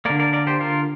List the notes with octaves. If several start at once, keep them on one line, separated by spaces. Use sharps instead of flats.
D3 A#3 A#4 D5
A#4 D5
A#4 D5
G4 C5
F4 A#4